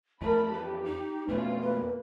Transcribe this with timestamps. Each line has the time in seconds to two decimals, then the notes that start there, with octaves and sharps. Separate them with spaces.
0.22 F2 E3 A3 A#4 A5 B5
0.53 G4 B4
0.85 D#4
1.29 F2 B2 A3 C#4 F4 B4
1.63 A#3 B4